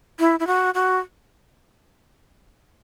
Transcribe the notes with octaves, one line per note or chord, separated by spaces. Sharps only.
E4
E4
F#4
F#4